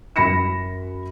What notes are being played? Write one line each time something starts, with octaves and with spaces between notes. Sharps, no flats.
F#2 B5 A#6 C#7 E7